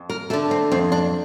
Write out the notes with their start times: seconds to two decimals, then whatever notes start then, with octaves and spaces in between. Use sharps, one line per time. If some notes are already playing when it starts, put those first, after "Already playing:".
Already playing: F2
0.10 A#4
0.30 D3 A3 A4
0.51 C4
0.71 F2 C4
0.92 D4